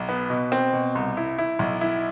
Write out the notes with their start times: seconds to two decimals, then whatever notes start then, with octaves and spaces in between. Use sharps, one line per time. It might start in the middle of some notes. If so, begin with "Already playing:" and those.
Already playing: B1
0.09 B3
0.30 B2
0.52 C4
0.73 B2
0.95 C2
1.17 E4
1.38 E4
1.59 B1
1.81 E4